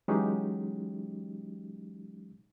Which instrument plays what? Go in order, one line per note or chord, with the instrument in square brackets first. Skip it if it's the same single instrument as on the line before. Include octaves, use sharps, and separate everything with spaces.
[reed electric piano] E3 F#3 G#3 C#4 D#4 G4